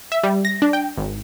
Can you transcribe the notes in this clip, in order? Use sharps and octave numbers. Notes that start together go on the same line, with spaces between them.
E5
G3
A#6
D4
G5
G#1